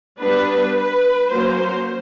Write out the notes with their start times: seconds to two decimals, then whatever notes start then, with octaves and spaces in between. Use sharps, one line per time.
0.20 G3 B3 D4 B4
0.77 B4
1.32 F#3 A#3 C#4 C5